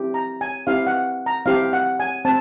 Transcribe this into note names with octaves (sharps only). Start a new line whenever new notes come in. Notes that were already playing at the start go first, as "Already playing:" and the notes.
Already playing: C4 E4 G4
A#5
G#5
C4 E4 G4 F5
F#5
A#5
C4 E4 G4 F5
F#5
G#5
C4 A5